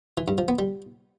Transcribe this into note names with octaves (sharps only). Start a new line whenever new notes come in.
E3
G2
F3
B3
G3